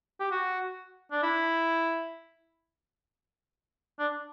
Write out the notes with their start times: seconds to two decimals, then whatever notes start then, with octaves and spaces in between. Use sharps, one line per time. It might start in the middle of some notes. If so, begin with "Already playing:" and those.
0.20 G4
0.31 F#4
1.12 D4
1.23 E4
3.99 D4